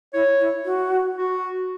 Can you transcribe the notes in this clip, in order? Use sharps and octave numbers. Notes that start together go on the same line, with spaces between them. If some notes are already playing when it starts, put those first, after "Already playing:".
E4 C#5
E4
F#4
F#4